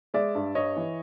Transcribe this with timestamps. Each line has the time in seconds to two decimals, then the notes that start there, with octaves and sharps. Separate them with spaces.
0.14 G#3 D5 E5
0.35 G2
0.55 G2 C#5 D#5
0.76 E3